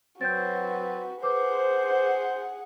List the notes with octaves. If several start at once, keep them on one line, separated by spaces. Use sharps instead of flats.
F#3 C4 F#4 B4 G6 A6
G#4 B4 C5 F#5 D6